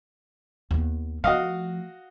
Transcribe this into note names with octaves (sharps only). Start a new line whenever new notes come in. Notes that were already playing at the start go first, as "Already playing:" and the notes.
D#2 B3
F3 A3 F#4 D#5 F5